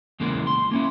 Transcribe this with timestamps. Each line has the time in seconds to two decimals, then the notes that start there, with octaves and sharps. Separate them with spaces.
0.20 E2 C#3 E3 G#3 A#3
0.47 C6
0.71 A#3 C#4 E4